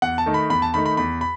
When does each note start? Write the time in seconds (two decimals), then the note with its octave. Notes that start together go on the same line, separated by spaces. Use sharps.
0.02 E2 F#5
0.18 A5
0.26 D#3 A3 D#4
0.34 B5
0.50 E2 B5
0.62 A5
0.74 D#3 A3 D#4 B5
0.86 B5
0.97 E2 B5
1.21 B5